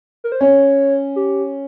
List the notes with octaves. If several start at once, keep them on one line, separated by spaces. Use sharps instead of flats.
A#4
C5
C#4 C#5
G4